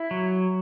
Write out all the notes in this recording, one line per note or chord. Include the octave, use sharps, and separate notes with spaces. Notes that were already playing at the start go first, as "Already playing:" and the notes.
Already playing: E4
F#3